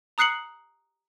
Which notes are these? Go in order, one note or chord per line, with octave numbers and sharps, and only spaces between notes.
A#5 D#6 F#6 C7 C#7 F#7